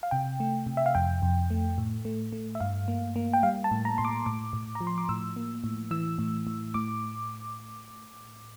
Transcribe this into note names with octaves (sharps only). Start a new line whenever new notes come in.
F5
C3 G5
A3
C3
E5
F5
F2 G5
F2
A3
A2
A3
A3
E5
G2 F5
A#3
A#3
G5
G3 F5
A5
A2
A#5
A2 C6
D6
A2 D6
A2
A#5
F3
C6
D6
A2 E6
A#3
A2
E3 E6
A2
A2
A2 D6